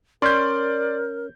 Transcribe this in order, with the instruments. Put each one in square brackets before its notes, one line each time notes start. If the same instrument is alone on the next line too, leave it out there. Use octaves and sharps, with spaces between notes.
[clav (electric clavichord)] C#4 [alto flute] A#4 [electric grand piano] D5 [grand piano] C6 G6